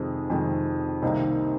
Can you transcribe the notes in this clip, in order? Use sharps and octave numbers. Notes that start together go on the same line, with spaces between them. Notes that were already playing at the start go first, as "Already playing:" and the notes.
Already playing: F2 C3 D#3 G#3
F2 C3 D#3 G#3
C2 C3 D#3 A#3 D#5